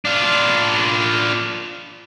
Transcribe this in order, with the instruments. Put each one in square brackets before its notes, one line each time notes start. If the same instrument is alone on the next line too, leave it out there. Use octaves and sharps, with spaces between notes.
[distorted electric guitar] D4 F4